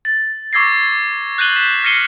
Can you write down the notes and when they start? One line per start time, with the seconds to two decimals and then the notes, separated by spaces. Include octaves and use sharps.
0.05 A6
0.53 C#6 D6 E6 G#6 A#6 C7
1.38 F#6 G6 A#6 D#7 F#7 G7
1.55 B6 E7
1.84 F6 A#6 C7 C#7 D#7 G7